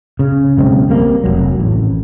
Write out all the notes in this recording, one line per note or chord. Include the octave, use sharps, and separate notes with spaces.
C#3
B1 C#3 G#3 C4
G3 A#3 C4
F1 B1 F#3
A1